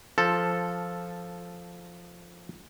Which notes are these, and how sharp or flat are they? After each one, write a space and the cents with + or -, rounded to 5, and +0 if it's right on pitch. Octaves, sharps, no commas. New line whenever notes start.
F3 +0 A4 +0